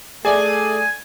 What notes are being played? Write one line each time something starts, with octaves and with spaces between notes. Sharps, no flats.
A3 G#4 D5 G#5